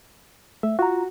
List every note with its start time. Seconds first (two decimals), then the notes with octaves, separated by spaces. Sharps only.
0.63 A3 E5
0.79 F4 F#4 A#5